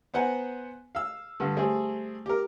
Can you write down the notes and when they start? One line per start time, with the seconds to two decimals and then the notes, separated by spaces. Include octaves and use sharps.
0.14 B3 C5 F#5 G#5 A#5
0.95 F5 E6
1.40 G2 D3
1.56 G3 A3 C4 G#4
2.26 G4 A#4